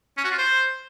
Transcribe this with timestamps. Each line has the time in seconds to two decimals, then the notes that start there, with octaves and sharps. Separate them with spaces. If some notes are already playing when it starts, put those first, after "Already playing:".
0.17 C#4
0.24 F#4
0.31 F4
0.38 C5